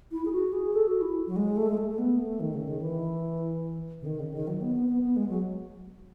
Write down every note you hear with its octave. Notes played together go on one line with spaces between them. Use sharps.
E4
G#4
F#4
G#4
A4
F#4
E4
F#3
G#3
A3
G#3
A3
A3
B3
A3
D#3
C#3
D#3
E3
C#3
D#3
C#3
D#3
F#3
B3
B3
B3
B3
G#3
F#3